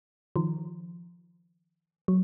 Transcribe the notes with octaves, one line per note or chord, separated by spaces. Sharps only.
D#3 F3
F#3